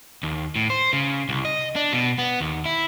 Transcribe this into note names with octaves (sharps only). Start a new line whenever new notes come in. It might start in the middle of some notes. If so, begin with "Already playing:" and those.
D#2
A2
C5
C#3
C2
D#5
D4
B2
B3
D#2
E4